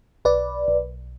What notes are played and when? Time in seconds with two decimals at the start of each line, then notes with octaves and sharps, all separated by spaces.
0.25 B1 B4 D5
0.68 B1